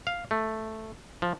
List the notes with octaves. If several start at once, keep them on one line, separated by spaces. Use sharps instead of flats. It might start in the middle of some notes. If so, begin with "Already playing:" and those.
F5
A3
F3